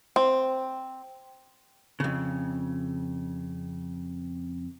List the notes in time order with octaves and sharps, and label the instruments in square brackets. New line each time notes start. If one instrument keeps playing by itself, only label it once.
[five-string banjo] C4
[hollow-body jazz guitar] F2 C#3